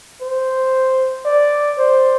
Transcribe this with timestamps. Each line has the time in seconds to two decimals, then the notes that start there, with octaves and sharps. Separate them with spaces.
0.21 C5
1.25 D5
1.78 C5